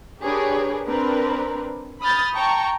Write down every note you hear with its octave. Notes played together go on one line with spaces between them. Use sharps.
D4 G4 G#4 A#4 B4 C#5
C4 D4 A#4 B4
B5 D#6 F6 G6 A6
G5 A5 A#5 C#6